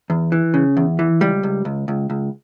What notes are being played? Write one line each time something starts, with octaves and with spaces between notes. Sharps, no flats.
E2
E3
C#3
E2
E3
C#2 G3
C#2
C#2
C#2
C#2